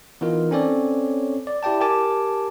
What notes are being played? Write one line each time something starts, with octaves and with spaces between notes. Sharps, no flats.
E3 B3 D#4 F4 A#4
C4 C#4 A4 C#5 D5
D5
E4 G4 D5 G5 A5
G4 A#4 G#5 A5 D6